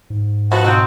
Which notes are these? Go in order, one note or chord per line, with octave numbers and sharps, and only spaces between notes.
G#2
F3 B3 F#4 F#5
B2 D3 C4 D#4